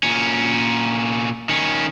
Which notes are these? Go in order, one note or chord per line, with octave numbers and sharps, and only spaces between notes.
A#2 C#4
D#3 C#4